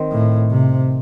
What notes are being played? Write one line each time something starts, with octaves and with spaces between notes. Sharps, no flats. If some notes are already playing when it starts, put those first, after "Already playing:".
Already playing: D#3 C4
A2
C3